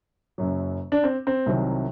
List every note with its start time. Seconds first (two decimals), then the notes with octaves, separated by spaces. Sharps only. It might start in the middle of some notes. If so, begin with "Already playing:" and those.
0.38 F#1 F#2 F#3
0.92 D4
1.04 C4
1.27 C4
1.46 C2 C3 D#3 F#3